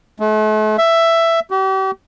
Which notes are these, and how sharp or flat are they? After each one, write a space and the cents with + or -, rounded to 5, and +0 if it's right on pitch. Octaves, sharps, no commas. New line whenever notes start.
A3 -40
E5 +10
G4 -40